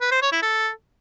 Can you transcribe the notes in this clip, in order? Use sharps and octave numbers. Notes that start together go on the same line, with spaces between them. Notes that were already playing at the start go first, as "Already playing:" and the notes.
B4
C5
C#5
E4
A4